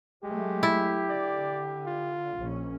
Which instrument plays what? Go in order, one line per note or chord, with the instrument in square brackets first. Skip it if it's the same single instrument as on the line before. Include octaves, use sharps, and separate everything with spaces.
[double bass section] F#3 A3 [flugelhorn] G#3 [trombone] G4
[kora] E4
[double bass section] D3 [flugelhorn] D5
[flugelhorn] F4
[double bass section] A#1 C#4